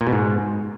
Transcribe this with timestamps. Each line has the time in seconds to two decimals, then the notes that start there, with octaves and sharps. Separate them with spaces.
0.01 A#2
0.07 B2
0.13 G#2